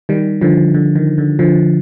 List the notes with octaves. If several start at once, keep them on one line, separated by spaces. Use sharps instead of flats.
D#3 G3
D3 F3
D3
D#3
D3
D3 F3